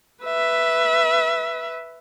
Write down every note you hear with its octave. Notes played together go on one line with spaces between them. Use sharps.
B4 E5